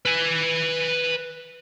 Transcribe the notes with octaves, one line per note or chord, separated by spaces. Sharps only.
B4 G#5